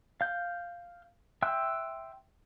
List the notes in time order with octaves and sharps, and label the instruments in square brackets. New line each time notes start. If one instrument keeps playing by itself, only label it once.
[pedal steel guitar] F5 G6
E5 G5 C6 E6 F#6